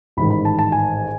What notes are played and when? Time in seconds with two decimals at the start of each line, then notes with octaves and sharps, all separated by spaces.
0.17 A1 G#2 D#3 B5
0.30 B5
0.45 A5
0.59 A5
0.72 G#5